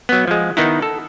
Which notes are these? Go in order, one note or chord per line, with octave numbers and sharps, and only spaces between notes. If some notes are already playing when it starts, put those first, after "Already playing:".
F#3 B3
F3 G#3
D#3 B3 D#4 E4
A4